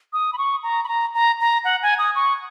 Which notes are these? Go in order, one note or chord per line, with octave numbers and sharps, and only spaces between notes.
D#6
B5
C#6
A#5
B5
A#5
A#5
A#5
F#5
G#5
D#6
C#6